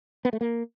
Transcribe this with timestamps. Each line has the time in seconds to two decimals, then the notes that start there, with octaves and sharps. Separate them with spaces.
0.25 B3
0.33 A3
0.41 A#3